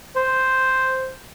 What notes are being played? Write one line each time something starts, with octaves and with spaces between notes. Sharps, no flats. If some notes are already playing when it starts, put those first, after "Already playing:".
C5